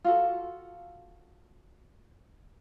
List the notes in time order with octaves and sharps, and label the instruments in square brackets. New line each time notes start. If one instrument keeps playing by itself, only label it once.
[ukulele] F4 F#4 A4